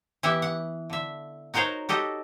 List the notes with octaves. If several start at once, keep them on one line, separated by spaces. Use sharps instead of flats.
E3 B3 E4 G4 E5 F#5
F#5
D3 E5
D#4 F#4 A#4 C5 C#5 F5
F#4 G4 A4 D#5